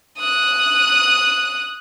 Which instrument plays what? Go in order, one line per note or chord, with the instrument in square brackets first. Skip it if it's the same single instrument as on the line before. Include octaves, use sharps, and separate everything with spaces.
[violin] D#6 F#6